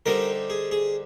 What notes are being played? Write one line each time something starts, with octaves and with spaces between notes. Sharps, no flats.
D3 G3 C4 D#4 A#4
G#4
G#4